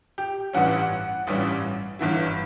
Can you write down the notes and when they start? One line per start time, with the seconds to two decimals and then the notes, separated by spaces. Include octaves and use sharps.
0.18 G4
0.53 A1 G2 E3 G3 C#4 F#5
1.27 A1 G2 E3 G3 C#4
1.99 G1 G2 E3 B3 E4